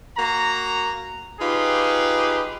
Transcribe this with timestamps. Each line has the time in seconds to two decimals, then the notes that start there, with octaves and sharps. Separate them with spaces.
0.17 A#3 F#4 A#5
1.40 D#4 F4 G4 G#4 B4